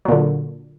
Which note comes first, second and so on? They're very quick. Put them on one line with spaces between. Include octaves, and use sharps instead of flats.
F#3 A#2 D3